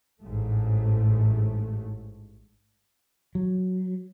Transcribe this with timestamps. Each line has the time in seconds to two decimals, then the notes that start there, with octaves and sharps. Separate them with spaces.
0.22 A1 G#2 A3
3.35 F#3